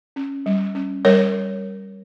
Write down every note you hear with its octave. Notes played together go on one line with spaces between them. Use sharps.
C#4
G3
C#4
G3 A#4 C#5